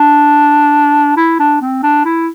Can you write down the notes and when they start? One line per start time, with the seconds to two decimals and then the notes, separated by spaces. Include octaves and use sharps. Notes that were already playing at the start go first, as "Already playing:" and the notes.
Already playing: D4
1.17 E4
1.39 D4
1.61 C4
1.83 D4
2.05 E4